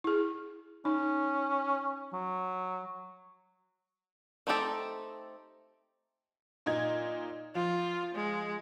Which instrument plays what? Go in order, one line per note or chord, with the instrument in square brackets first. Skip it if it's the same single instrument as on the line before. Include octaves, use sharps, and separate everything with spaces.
[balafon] E4 G#4
[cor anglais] C#4 [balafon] D#4
[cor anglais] F#3
[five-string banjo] A3 C4 D#4 G4 A4
[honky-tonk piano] A#2 D#4 G#6
[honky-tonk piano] F3 [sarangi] F4
[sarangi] G#3